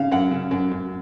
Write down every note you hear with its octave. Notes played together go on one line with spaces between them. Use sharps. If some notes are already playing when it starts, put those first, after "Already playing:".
Already playing: C#3 F5
F#2 F#5
C#3
F#2
F#2